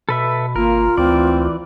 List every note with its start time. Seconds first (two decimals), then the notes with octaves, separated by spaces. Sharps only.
0.09 B2 A4 B4 E5
0.56 G#1 A#3 F4 A#4
0.97 D2 E3 C4 D5